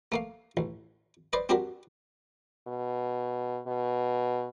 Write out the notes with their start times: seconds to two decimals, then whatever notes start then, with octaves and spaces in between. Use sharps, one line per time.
0.12 A3 A#3 F5
0.57 A1
1.33 B4 C5 D5 D#5
1.49 C4 D4 F#4 G4 A#4
2.67 B2
3.67 B2